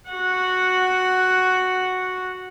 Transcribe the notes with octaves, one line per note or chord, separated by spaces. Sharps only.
F#4 F#5